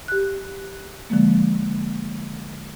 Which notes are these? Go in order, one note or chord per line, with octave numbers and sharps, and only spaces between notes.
G4 F#6
D3 F3 G#3 A#3